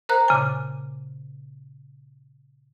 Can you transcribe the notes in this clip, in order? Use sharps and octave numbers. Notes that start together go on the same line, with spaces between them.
A#4 C5 A#5 F#6
A#2 C#3 G#5